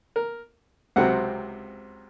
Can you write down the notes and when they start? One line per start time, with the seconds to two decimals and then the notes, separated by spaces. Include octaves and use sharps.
0.16 A#4
0.96 C#2 C3 F#3 C4 F#5